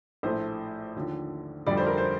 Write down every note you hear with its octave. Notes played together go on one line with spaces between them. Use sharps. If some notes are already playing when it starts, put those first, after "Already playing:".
A#1 A2 A3 C5
D#2 D3 F3
F1 F2 D3 G3 D5
C5
A#4
C5